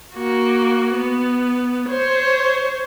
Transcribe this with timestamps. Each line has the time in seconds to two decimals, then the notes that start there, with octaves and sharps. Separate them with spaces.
0.15 A#3 F#4
0.94 B3
1.89 C5 C#5